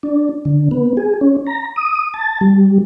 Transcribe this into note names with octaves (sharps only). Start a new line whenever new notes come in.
D4
D3
B3
G#4
C#4
A#5
D#6
A5
G3